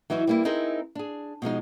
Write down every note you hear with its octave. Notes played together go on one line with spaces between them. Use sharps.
E3 F#3 D#4 E4 F#4
G3 A#3 E4
C4 D#4 E4 G#4 A#4 C5
D4 G#4
B2 F3 G#3 D#4